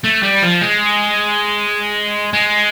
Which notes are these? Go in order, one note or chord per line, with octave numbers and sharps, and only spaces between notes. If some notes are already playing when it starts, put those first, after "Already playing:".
A3
G3
F3
G#3
G#3